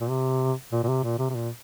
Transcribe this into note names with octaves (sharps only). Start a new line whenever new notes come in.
A#2
C3
A#2
A#2
C3
A#2
C3
C3
A#2